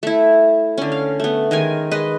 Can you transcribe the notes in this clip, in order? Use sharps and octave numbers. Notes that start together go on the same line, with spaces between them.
A3 E4
D3 C#4
F5
A3 B3
D#3 G#3 A#4 G#5
G#3 B4 D#5